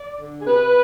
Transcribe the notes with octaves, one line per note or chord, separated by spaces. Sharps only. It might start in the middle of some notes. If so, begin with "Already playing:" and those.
Already playing: D5
D3
G#4
C3 B4